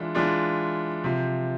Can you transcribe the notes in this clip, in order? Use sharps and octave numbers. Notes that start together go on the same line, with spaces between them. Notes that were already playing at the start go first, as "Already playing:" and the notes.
Already playing: E3 G#3 D4 F4
E3 G#3 D4 F4
C3 F3